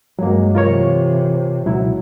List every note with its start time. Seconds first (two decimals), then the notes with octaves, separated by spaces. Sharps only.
0.19 G2 F#3 G#3 A#3
0.55 C3 E3 F4 A#4 C#5
1.66 C#2 B2 F#3 E4